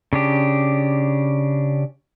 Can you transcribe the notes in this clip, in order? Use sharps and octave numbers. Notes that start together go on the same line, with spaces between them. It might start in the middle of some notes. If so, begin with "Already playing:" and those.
C#3 D4 G4